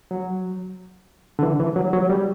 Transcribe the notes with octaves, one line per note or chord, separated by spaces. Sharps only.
F#3
D3
E3
E3
F#3
F#3
G3